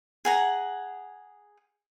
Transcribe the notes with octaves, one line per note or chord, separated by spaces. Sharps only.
G#4 F#5 A#5